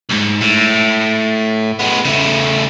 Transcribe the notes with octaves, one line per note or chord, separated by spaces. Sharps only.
C#2 G#2
A2
G#3 B3
C#3 A3